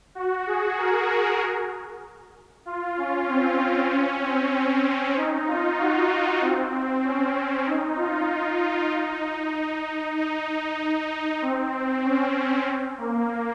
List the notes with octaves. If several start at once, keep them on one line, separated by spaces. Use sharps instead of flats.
F#4
G#4
A#4
F4
C#4
C4
C#4
C4
D#4
F4
F#4
C4
C4
C#4
D#4
F4
D#4
D#4
C4
C#4
A#3